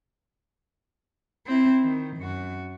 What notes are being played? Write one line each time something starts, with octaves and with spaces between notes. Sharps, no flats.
C4 E4
D#3
F#2 F#4